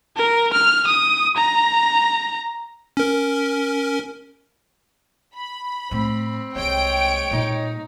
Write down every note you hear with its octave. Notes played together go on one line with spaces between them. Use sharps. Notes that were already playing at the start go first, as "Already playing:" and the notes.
A#4
F6
D#6
A#5
C#4 A#4
B5
A2 A3 C4
C2 G#3 A#3 C#5 G5 D7
A#2 G3 D#4